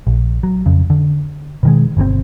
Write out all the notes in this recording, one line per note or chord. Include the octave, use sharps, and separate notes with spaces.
A#1
F#3
F2 C#3
D3
B2 D#3 G#3
G1 B2 D3 C4